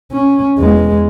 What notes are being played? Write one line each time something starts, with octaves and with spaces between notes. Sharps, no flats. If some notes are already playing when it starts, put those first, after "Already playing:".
C#4
E2 G#3